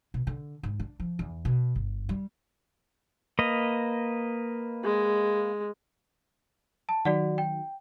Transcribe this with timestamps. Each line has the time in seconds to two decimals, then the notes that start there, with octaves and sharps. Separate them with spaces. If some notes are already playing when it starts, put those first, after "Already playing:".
0.14 B2
0.27 D3
0.63 G#2
0.80 D4
1.00 F3
1.19 E2
1.45 B2
1.75 G1
2.09 G3
3.39 A#3 B4 D#5
4.84 G#3
6.89 A5
7.05 D#3 F#3 F#4 D5 F#5
7.38 G5